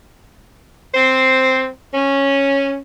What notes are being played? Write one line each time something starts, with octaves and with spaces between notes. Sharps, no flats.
C4 C5
C#4